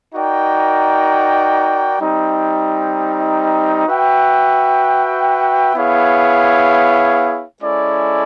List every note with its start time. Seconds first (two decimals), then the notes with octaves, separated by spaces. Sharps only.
0.15 D#4 F#4 A#4 D5 G5
2.01 G3 C4 D#4
3.88 F#4 B4 E5 G5
5.75 B3 E4 G#4 C#5 F5
7.62 G#3 C#4 E4 A4 D5